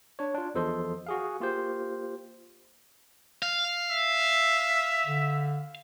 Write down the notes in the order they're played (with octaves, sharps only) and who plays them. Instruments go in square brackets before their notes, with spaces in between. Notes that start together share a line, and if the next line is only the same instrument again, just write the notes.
[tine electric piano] D4 C#5
D4 F4
E2 F3 A4 C5 D#5 C6
F#4 G#4 F5
A#3 F4 G4 C5
[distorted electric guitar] F5
[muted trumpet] E5
[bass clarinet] D3